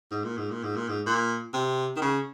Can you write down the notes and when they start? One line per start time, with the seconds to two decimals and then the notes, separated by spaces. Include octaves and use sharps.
0.11 G#2
0.24 A#2
0.37 G#2
0.51 A#2
0.63 G#2
0.76 A#2
0.88 G#2
1.06 A#2
1.54 C3
1.96 D#3
2.02 C#3